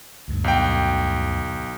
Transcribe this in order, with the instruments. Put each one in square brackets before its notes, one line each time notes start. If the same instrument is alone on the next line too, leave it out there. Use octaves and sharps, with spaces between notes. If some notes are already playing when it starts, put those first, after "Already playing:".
[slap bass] D2 G2
[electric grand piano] B1 G5